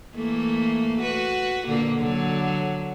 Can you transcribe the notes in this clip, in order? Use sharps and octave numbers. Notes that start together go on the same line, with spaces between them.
E3 A3 A#3
F#4 B4
A#2 D3 A#3
D3 F#3